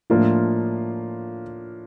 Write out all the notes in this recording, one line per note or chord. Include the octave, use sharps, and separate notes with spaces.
A2 F3 A#3 D4 F4